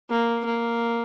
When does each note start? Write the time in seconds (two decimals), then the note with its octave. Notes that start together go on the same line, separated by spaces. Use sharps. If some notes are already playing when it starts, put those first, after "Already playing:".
0.10 A#3
0.45 A#3